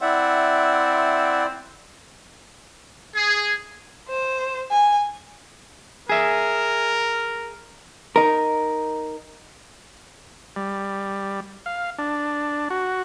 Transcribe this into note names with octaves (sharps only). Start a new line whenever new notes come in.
C4 E4 D5 E5 F#5
G#4
C5
G#5
G#4 A#4 E5
D#4 A#4
G3
F5
D4
F#4